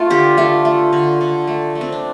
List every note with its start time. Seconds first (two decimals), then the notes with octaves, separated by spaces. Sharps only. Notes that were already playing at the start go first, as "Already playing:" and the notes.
Already playing: A3 F4
0.10 D3 G4
0.37 A3 F4
0.65 A3
0.93 D3
1.21 D3
1.48 A3
1.75 A3
1.81 C4
1.92 D4